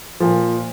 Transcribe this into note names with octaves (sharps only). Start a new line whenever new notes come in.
A#2 F3